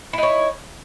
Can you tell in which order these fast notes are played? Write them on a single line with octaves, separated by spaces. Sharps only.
E4 D#4 C#5